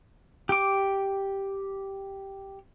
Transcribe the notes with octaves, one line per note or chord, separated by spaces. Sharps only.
G4 D6